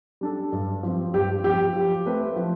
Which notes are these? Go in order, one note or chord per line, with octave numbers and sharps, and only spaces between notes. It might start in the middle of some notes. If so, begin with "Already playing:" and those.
G3 D4 A4
G2
F3 C4
G2 G4
F3 C4 G4
F3
A3 C4 G4 B4
F3